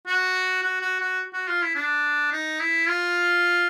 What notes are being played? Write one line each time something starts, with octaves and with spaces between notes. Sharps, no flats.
F#4
F#4
F#4
F#4
F#4
F4
E4
D4
D#4
E4
F4